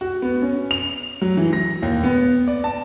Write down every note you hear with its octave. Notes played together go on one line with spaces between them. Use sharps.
F#4
B3
C#4
F7
F#3
E3
A#6
D#2
B3
D5
A5